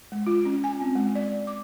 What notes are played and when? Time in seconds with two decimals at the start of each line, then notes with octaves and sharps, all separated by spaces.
0.12 G#3
0.27 F4
0.45 C#4
0.64 G#5
0.81 C4
0.96 G#3
1.15 D5
1.47 D6